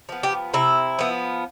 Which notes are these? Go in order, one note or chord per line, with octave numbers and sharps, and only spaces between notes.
F3 B3
G4
C3 E4
F3 B3